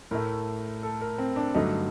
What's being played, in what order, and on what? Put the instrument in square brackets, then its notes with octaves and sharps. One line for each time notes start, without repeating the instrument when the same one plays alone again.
[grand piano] A2 A3 A#4
A4
A#4
C4
D4
G2 D3 F#3 A3 D#4